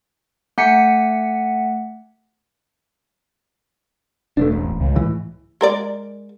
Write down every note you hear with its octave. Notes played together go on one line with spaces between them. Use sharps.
A3 F#5 G#5 B6 C#7
E1 A3 C4 D4
A1
C#2
A2 E3
G#3 A#4 D5